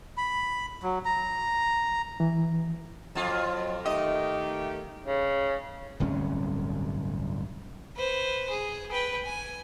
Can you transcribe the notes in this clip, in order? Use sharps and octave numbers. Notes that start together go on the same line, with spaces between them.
B5
F#3
A#5
E3
F2 F#3 F4
D#3 A3 G4 D#5
C#3
D1 G1 C2 C#4
B4 C5
G#4
B4 G5
G#5